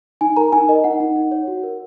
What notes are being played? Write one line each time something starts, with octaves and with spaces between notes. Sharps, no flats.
D#4 G#5
A#4 A#5
D#4 G#5
A#4 D#5
D#4 F#5
D#4
D#4
C#5
F#4
A#4